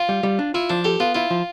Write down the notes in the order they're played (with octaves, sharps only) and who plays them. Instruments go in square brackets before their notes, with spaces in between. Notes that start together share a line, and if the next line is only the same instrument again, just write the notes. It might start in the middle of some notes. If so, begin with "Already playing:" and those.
Already playing: [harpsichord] F4
[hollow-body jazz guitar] G3
G3
D4
[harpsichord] E4 [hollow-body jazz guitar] F4
[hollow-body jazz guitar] F3 [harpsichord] D4
[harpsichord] G4 [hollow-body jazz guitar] A4
[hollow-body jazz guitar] B3 [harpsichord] F4
[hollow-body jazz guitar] E4 [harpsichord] F4
[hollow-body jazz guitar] F3